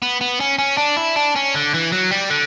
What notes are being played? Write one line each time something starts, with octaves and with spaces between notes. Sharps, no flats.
B3
B3
C#4
C#4
D4
E4
D4
C#4
D3
E3
F#3
G3
D3